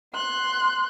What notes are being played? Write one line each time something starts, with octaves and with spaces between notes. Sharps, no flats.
C6 F#6